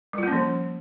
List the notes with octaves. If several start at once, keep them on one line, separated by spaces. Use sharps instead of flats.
F3 G3 A#3 C#4 F4